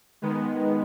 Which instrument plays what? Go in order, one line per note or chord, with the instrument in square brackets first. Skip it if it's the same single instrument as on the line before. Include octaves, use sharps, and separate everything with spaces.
[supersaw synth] D#3 G#3 B3